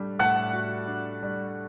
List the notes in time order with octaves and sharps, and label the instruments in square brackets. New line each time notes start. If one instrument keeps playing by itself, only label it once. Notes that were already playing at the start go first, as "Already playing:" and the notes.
Already playing: [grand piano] A2 G3 D4
[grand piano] A2 [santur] F#5 A5
[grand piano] F#4
D4
G3